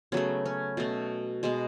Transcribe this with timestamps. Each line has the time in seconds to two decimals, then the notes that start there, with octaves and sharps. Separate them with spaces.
0.12 C#3 F#3 A3 B3
0.45 C#4
0.77 B2 A3
1.43 B2 G#3 B3